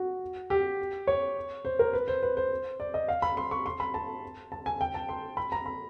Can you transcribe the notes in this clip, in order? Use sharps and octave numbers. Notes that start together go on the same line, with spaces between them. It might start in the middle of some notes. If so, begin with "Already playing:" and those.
Already playing: F#4
G4
C#5
C5
A#4
B4
C5
B4
C5
D5
D#5
F5
B5
C6
C#6
C6
B5
A5
A5
G#5
G5
A5
C6
B5
A#5
B5